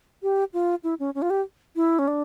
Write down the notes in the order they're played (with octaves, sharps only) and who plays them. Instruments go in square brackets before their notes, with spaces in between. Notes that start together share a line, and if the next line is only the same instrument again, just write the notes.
[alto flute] G4
F4
E4
C#4
C#4
F4
G4
E4
C#4
D4